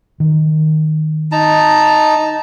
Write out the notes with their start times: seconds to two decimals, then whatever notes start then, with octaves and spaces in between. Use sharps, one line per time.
0.20 D#3
1.32 D#4 A5 A#5